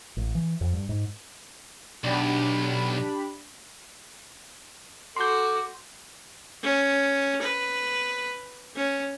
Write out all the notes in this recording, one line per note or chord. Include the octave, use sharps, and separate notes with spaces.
A1
E3
F2
G2
G#2
B1 D4 G4 B5
F#4 A4 C6 D6 G6
C#4
B4
C#4